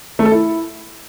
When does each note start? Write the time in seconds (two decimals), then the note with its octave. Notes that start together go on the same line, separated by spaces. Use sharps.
0.19 A3
0.25 A4
0.32 E4